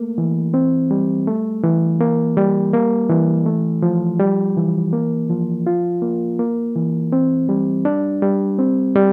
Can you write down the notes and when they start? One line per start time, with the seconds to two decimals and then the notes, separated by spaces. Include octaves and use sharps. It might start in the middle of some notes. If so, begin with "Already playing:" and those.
Already playing: A3 A#3
0.18 E3
0.54 C4
0.91 G3
1.27 A3
1.63 E3
2.00 A#3
2.37 G3
2.73 A#3
3.10 E3
3.46 A3
3.82 F3
4.20 G3
4.57 E3
4.93 A#3
5.30 F3
5.67 F4
6.02 A#3
6.39 A#3
6.76 E3
7.12 C4
7.49 G3
7.85 D4
8.22 G3
8.59 C4
8.96 G3